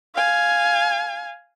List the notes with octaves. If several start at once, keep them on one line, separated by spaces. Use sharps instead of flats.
F5 G#5